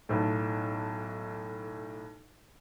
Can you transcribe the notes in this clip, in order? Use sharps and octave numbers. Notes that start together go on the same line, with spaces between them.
B1 A2